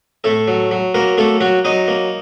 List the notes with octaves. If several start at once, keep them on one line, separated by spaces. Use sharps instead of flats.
A2 A3 A4
F#3
F#3
F#3 A#3 A#4
A3 A#3 A4
F#3 F#4
F#3 D#4 D#5
A#3